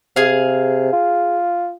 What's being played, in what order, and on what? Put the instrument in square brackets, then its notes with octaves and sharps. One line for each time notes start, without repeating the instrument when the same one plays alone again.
[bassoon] C3 [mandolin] G#4 F5
[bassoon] F4